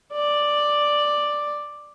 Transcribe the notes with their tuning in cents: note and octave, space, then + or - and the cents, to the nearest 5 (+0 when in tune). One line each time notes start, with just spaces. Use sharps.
D5 +5